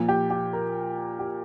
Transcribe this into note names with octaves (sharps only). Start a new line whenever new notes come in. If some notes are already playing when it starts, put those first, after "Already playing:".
Already playing: A#2 F3
G4
G4
A#4
G4